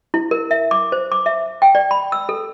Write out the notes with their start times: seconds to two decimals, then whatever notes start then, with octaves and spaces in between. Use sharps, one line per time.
0.14 E4
0.31 A#4
0.51 E5
0.71 D6
0.92 C5
1.12 D6
1.26 E5
1.62 G5
1.75 D5
1.91 B5
2.12 E6
2.29 A4